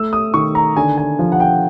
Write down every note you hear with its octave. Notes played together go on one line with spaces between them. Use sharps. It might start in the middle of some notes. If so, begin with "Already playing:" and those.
Already playing: A3 E6
D#6
D#3 C#6
A#5
D3 G#5
G#5
F3
F#5
G5